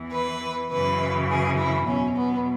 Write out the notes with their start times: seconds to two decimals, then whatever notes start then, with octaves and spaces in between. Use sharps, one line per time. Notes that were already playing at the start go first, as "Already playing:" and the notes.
Already playing: E2 E3
0.12 B4
0.71 F#2 C#3 E3 B4
1.30 G#4
1.58 E4
1.87 E2 B2 F#3 C#4
2.17 B3